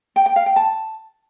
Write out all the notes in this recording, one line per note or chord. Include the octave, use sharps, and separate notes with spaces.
G5
G5
F5
G5
A5